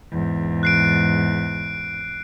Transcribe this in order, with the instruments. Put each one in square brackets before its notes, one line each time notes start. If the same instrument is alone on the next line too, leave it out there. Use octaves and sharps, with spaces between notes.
[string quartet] E2 G#2
[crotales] F#6 C7 D7